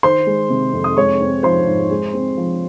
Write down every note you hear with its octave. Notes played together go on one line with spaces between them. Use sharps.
D#3 C5 C6
G#3
C3
F2
D#6
G#3 C#5 C#6
C4
F3 C5 C6
G#2
G#3
C4
F3